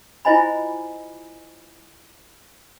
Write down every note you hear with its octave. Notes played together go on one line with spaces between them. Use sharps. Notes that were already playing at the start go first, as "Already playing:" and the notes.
E4 F4 C5 D#5 G#5 B5